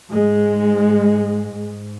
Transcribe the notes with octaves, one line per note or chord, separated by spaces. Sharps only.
G#2 G#3
G#2